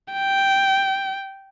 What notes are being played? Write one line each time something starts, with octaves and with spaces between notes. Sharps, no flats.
G5